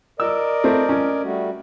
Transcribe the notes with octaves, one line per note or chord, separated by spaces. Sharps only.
A#4 D5 D#5 E6
A3 C4
C#4
G3 A3 F#4